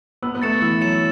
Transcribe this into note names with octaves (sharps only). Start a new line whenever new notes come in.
B3 E6
B3
A3 A6 C#7 E7
E3 E6
F#3 A6 C#7 E7